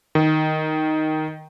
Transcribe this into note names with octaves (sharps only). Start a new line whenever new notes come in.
D#3